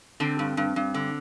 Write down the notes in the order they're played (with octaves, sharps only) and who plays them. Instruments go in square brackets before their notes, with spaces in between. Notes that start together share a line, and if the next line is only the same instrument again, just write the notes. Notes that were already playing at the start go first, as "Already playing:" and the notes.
[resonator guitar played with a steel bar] D3 [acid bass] C4
[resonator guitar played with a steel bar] G2
G2
G2
D3